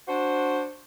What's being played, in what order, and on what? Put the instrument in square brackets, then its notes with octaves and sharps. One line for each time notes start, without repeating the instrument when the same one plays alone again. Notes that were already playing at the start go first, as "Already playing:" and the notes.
[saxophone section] D4 F#4 C5